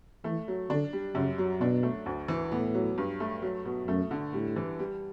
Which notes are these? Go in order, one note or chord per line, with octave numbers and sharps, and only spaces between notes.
E3 A3
F#3
D3 D4
G3
F#2 C#3
F#3
B2 D4
A3
D2
E3
A2 B3
F#3
G2
A3
F#3
B2
F#2 A3
D3
A2 G3
E3
G3